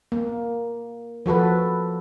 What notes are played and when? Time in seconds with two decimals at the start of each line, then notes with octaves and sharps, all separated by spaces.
0.12 A#3
1.26 F3 F#4 A4 B4